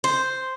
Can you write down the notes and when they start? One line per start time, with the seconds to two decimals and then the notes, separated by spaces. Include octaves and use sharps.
0.04 C5